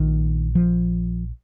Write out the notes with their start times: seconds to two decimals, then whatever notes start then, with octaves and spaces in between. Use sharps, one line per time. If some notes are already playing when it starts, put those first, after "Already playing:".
Already playing: A#1 A#2 D#3
0.55 F3